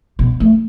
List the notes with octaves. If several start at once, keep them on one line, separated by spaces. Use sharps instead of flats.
B2
A3